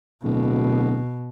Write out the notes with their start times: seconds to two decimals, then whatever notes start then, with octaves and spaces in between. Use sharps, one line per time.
0.23 D1 B2